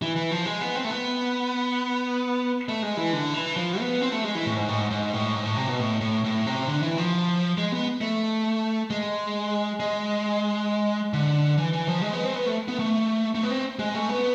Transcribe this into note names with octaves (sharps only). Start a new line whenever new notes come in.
E3
E3
F3
G#3
B3
C4
A3
B3
A3
G#3
E3
D3
E3
F3
B3
C4
A3
G#3
E3
A2
G#2
A2
G#2
G#2
A2
G#2
A2
C3
B2
A2
A2
A2
C3
D3
E3
F3
G#3
B3
A3
G#3
G#3
D3
E3
E3
F3
G#3
B3
C4
B3
A3
B3
A3
A3
B3
C4
G#3
A3
B3